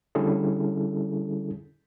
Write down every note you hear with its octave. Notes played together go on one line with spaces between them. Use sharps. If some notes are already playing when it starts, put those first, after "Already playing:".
D3 G3 C#4 E4 G#4 A4